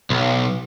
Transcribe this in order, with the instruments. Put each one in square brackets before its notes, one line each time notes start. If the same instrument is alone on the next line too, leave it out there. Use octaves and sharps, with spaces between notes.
[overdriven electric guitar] B1